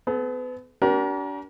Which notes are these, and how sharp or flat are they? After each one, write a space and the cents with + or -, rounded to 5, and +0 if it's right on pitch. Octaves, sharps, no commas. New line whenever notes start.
B3 +35 A4 -35
D4 -35 G4 -45 A#4 +30